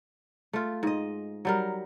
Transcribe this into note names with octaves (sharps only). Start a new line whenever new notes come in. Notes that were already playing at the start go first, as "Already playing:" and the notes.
A3 F4
G#2 D#5
F#3 G3 A#4